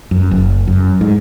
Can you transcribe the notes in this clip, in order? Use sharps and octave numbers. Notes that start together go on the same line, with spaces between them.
F#2
F#1
F#2
G#2